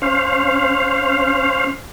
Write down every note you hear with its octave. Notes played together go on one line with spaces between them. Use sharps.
C#4 C5 F5